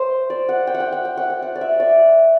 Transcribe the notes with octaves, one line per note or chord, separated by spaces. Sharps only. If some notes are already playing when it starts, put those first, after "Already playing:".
Already playing: C5
D5
F#5
G5
F#5
G5
F#5
G5
F#5
G5
F#5
D5
E5
D5